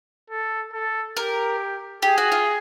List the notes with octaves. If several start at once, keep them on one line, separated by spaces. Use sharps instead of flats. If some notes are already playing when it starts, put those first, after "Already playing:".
A4
A4
G4 A#4
G4 G#4
F#4
F4